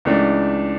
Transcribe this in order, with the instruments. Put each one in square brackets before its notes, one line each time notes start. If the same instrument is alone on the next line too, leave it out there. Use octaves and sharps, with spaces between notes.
[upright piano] C#2 C#3 E3 A3 D4